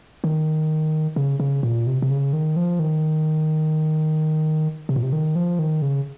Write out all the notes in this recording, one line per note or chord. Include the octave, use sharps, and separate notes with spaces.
D#3
C#3
C#3
A#2
C3
C3
C#3
D#3
F3
D#3
C3
A#2
C3
D#3
F3
D#3
C#3